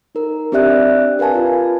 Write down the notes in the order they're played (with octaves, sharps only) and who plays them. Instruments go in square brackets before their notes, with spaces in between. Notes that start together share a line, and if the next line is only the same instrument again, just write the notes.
[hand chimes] D#4 A#4
C4 D4 G4 D5 E5 F#6
A#4 B4 F5 G#5 A5
F4